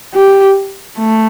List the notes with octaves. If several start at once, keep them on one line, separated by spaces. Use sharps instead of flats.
G4
A3